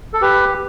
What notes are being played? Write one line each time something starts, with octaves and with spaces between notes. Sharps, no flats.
A4
G4 B4